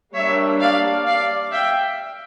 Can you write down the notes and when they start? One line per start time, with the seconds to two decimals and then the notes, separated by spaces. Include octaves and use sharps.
0.14 G3 A#3 D4 C#5 E5
0.60 D5 F5
1.06 D5 F5
1.52 E5 G5